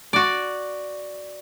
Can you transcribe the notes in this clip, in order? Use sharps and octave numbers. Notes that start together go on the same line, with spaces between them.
F#4 D5